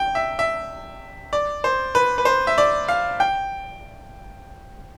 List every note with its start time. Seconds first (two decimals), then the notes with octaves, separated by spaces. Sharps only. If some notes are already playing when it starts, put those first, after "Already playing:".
Already playing: G5
0.15 E5
0.39 E5
1.33 D5
1.64 C5
1.95 B4
2.18 B4
2.25 C5
2.47 E5
2.58 D5
2.88 F5
3.20 G5